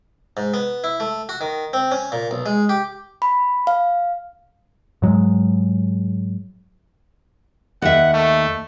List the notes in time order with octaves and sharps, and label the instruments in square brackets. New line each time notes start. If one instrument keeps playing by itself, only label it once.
[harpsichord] G#2
B3
E4
A3
F#4
D#3
C4
C#4
A#2
B1
G#3
G4
[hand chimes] B5
F5
[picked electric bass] G#2 F#3 G#3
[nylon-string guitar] D#2 E5 [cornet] F#5
[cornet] A3